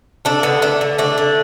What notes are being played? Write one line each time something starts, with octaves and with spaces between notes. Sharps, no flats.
A3 D4
D3 B3
A3 D4
D3
A3 D4
D3